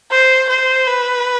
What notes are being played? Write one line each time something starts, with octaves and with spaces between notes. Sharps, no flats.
C5
C5
B4